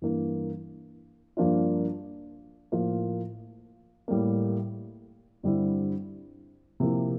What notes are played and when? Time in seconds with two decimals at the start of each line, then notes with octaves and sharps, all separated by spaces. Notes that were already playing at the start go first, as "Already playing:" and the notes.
0.02 G2 E3 A#3
1.37 G2 F3 A#3 D4 F4
2.72 A2 F3 A#3 F4
4.08 A2 G3 A#3
5.43 G2 D3 G3 C4 E4
6.80 C3 F3 A#3 E4